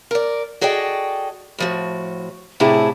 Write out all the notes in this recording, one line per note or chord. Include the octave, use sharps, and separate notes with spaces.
A#4 D5
F#4 G#4 A4 D5 D#5 G5
A2 F3 F#4
A2 C3 A3 D4 E4 G#4